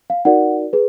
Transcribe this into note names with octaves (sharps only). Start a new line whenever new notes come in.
F5
D#4 F#4 A#4 D5 F#5
G#4 B4